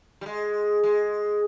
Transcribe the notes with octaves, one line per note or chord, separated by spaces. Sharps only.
G3
G#3
G#3